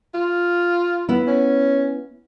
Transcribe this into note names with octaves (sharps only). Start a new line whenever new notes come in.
F4
B3 E4
C#4